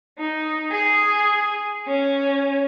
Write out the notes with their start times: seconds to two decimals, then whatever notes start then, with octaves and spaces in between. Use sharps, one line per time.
0.18 D#4
0.70 G#4
1.86 C#4